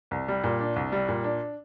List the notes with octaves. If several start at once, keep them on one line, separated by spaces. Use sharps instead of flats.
C2
G3
A#2
D4
C2
G3
A#2
D4